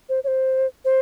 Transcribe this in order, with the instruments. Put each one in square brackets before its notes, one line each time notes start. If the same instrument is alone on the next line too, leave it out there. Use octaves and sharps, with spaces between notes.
[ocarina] C5
C#5
C5
C5